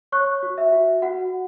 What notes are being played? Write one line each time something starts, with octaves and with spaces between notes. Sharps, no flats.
C#5 C#6 F#6
F#4
E5
F#4
F#4 F#5